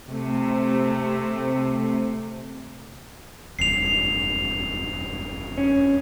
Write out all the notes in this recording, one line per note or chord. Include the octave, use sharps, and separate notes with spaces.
C3 A3
F1 E2 G2 C7 F7
C#4